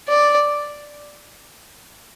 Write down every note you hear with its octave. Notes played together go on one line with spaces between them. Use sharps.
D5